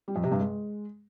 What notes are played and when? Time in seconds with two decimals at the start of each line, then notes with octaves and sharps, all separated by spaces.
0.08 G3
0.16 F2
0.24 C3
0.32 G2
0.40 G#3